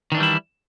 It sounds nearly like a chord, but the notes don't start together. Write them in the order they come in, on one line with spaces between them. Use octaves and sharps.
D#3 D4 E3 G3 E4